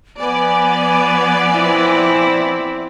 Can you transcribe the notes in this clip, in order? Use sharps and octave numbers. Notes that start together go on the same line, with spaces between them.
F3 B3 B4 D5 G#5
C4 E4